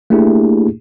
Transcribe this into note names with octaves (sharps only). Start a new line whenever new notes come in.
A3 A#3 D4 E4 G4 G#4